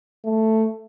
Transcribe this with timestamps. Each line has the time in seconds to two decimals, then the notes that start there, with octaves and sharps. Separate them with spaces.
0.25 A3